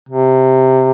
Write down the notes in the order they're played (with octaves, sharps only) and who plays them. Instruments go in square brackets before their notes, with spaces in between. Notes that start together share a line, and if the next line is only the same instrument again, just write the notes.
[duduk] C3